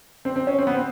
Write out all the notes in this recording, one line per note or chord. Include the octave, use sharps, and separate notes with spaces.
C4
C4
C#4
C4
B3
C4